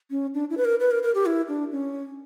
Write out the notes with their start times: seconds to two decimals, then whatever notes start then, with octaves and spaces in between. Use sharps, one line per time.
0.11 C#4
0.34 D4
0.50 E4
0.57 B4
0.65 A#4
0.80 B4
0.91 A#4
1.03 A#4
1.15 G4
1.26 E4
1.48 D4
1.72 C#4